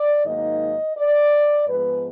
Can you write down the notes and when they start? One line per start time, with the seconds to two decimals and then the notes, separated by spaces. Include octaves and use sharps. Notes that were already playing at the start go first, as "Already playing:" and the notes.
Already playing: D5
0.26 G#2 D#3 F#3 A#3 D#4 D#5
0.97 D5
1.68 G#2 F3 G#3 B3 B4